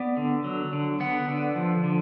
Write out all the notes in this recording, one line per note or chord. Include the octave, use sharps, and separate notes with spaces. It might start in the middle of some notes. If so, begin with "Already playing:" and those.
Already playing: B3 D5
D3
F#3
D3
B3 F#5
D3
F3
D3